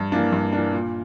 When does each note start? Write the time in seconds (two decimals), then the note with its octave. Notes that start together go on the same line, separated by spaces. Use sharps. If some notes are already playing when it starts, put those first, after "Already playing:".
Already playing: G2
0.12 E3 A#3 D4
0.32 G2
0.53 E3 A#3 D4
0.73 A#2